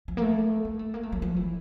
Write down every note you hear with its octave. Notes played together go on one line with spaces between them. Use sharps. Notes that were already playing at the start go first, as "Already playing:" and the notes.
F3
A#3
A3
A#3
A3
A#3
A3
F#3
F3
E3